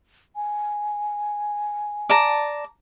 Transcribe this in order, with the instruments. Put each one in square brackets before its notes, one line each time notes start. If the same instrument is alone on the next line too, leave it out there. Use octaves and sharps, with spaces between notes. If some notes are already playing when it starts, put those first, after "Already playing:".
[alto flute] G#5
[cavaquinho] D5 A5 A#5